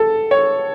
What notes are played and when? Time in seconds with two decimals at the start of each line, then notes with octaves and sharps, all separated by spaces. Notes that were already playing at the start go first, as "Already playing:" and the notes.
Already playing: A4
0.31 C#5